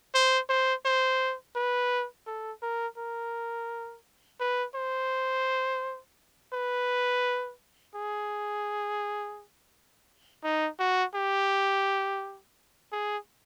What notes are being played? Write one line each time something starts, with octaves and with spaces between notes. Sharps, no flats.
C5
C5
C5
B4
A4
A#4
A#4
B4
C5
B4
G#4
D#4
F#4
G4
G#4